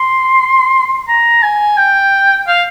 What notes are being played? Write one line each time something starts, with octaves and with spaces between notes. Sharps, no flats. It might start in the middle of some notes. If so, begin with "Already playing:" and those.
Already playing: C6
A#5
G#5
G5
F5